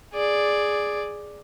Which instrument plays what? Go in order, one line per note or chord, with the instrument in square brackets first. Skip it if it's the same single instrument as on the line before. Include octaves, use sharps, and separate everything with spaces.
[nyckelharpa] G#4 D5